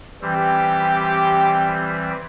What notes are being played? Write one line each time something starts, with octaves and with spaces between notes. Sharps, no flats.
E3 G3 C4 G4